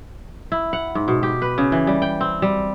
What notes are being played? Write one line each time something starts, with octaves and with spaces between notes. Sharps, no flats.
E4
F#5
G#2
B2
G4
B4
C#3
E3
G3
G5
C4
G3